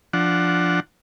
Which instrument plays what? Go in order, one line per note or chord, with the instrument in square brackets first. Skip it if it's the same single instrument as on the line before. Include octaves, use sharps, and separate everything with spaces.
[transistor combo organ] F3 D4 F#5